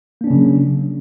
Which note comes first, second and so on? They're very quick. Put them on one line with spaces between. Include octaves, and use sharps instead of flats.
A#3 D4 C#4 C#3 F#3